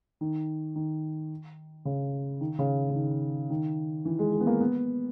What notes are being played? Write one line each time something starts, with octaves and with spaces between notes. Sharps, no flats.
D#3
D#3
C#3
D#3
C#3
C#3
D#3
D#3
E3
G#3
G#3
B3
A#3
B3